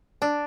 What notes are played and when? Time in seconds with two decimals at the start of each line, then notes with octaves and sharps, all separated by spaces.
0.22 D4